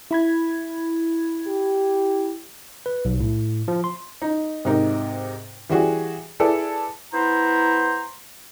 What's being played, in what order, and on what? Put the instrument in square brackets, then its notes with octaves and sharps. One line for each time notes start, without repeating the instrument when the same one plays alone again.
[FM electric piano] E4 B5 G#6
[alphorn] G4
[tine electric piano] B4
B1
A2
F3
C6
[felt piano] D#4
G#2 C3 D#4 A#4
E3 G3 F#4 G#4
E4 G#4 A4 B4 D5
[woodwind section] B3 E4 C5 A#5